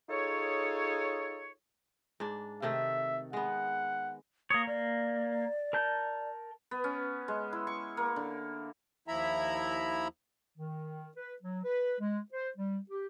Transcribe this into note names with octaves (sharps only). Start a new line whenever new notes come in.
D#4 F4 G#4 A4 C#5
G#2 D4
C3 D#3 A3 E5
G#3 B3 F#5
A#3 C#5 D#6
A#3 D5
A#4 A5 G6
B3
C#4
G#3
E4
C#6
A#3
D3
D#2 F3 E4 E5 A#5 B5
D#3
B4
F#3
B4
G#3
C5
G3
G4